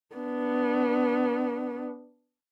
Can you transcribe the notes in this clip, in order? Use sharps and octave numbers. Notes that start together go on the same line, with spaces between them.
B3 D4